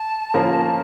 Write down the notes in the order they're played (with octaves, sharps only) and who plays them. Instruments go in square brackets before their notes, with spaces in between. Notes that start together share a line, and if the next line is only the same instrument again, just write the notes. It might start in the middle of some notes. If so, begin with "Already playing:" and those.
Already playing: [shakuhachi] A5
[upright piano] F3 A#3 C#4 F4 A#4